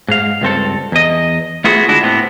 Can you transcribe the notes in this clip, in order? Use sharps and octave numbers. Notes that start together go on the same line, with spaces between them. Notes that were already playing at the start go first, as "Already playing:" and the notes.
G#2 F5
C#2 G2 C4 A4
E2 D#5
A3 B3 F4 F#4 G#4 A4
D3 G#3 D4 E4 F#4
A2 B3 C4